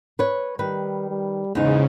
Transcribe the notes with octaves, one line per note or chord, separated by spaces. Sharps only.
B4 C#5
D#3 G3 B4
G3
E2 G#2 C#3 D#4